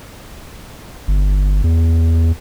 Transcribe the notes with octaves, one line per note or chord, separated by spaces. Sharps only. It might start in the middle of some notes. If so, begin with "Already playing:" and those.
G1
E2